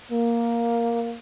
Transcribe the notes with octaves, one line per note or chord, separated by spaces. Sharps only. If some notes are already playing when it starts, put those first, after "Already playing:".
A#3